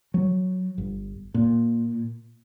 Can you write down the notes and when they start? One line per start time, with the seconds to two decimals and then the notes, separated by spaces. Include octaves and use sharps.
0.14 F#3
0.78 G1
1.34 A#2